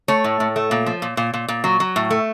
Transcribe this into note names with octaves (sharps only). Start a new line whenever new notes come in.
A3 C#5
A2
A2
A3
A#2
F3
A#2
A#2
A#2
A#2
F#3
F#3
A2
A3